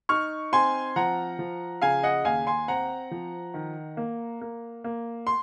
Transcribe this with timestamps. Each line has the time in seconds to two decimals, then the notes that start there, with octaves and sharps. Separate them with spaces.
0.09 D#4 C#6 F6
0.52 C4 G#5 C6
0.96 F3 F#5 A#5
1.39 F3
1.82 C#3 F5 G#5
2.03 D#5 F#5
2.25 D#2 F5 G#5
2.47 G#5 C6
2.68 C4 F#5 A#5
3.11 F3
3.54 D#3
3.97 A#3
4.41 A#3
4.84 A#3
5.27 C6